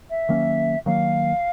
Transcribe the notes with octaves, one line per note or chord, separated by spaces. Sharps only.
E5
D#3 F#3 A#3 C#4
D#3 F#3 A#3 F5